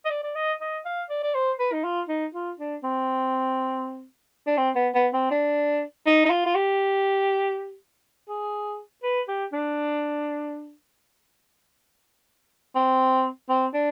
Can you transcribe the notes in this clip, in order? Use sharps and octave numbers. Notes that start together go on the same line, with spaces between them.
D#5
D5
D5
D#5
D#5
F5
D5
D5
C5
B4
D#4
F4
D#4
F4
D4
C4
D4
C4
B3
B3
C4
D4
D#4
D#4
F4
F4
G4
G#4
B4
G4
D4
C4
C4
D4